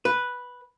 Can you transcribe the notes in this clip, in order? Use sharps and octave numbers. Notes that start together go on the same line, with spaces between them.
B4